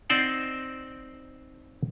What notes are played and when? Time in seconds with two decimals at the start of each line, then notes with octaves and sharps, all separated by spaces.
0.10 C4 D#4 C5 D5 F#5